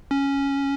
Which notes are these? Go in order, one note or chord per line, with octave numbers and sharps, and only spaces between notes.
C#4